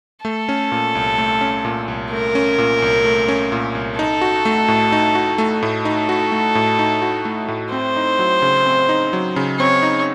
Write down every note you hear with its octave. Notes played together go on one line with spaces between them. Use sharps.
A3 A4
C#4
A#2
C2
A3
C#4
A#2
C2
A3 A#4
C#4
A#2
C2
A3
C#4
A#2
C2
D#4 A4
F#4
A3
A2
D#4
F#4
A3
A2
D#4 A4
F#4
A3
A2
D#4
F#4
A3
A2
C4 C5
D#4
F#3
C#3
C4
D#4
F#3
C#3
C4 C#5
D#4